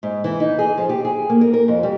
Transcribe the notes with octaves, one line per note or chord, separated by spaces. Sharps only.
G#2
E3
D#4
G#4
F3
G4
G#4
A#3
A#4
A#4
F2
G3